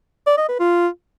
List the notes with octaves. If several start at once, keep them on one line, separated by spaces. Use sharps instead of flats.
D5
D#5
B4
F4